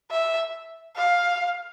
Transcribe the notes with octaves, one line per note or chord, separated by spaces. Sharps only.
E5
F5